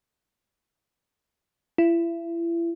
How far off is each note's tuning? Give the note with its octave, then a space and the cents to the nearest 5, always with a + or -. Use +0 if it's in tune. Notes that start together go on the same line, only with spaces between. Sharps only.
E4 +35